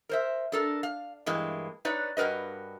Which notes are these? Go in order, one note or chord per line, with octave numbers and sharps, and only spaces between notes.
A#4 C5 E5
D4 A4 A#4
F5
G2 E3 G#3 A#3
D#4 B4 C#5 D5
G2 F#4 A#4 B4 D#5